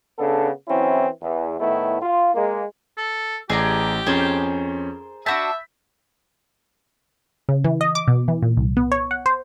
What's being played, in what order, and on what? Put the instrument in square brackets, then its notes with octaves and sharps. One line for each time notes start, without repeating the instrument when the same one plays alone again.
[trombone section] C#3 B3 D4 A4
E3 F#3 C4 C#4 E4
E2
A2 D#3 A3 B3 E4
F4
G#3 A#3
[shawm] A4
[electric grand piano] A1 [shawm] G4 [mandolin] G#4 D5 A#5
[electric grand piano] F2 C#4 A6 [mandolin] G#4 A#4 C5
[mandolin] D4 F#4 A5 [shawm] E5 [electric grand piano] B5 G6 B6
[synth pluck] C#3
E3
D#5
D6
B2
E3
A#2
C2
B3
C#5
F#5
C5